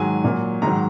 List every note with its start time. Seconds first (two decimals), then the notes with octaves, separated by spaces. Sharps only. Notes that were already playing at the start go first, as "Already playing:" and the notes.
Already playing: G#2 D#3 F#3 G#5
0.24 A#2 F#3
0.62 G#2 D#3 F#3 A#5